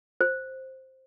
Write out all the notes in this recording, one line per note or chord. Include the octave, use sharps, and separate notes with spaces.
C5